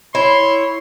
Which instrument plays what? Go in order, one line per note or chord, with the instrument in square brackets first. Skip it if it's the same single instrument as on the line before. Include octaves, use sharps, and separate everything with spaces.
[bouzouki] E4 [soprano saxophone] C#5 [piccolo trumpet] C6